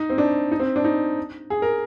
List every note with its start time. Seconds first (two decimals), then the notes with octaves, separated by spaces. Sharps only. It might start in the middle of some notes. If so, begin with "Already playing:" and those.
Already playing: D#4
0.10 C4
0.18 D4
0.52 D#4
0.60 C4
0.76 D4
0.84 D#4
1.50 G#4
1.62 A#4